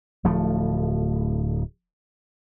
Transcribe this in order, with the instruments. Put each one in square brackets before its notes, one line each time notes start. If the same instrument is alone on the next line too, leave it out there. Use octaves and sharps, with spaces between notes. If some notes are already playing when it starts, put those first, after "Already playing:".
[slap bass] D1 F3 A3